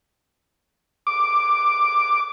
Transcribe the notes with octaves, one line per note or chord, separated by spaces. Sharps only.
D6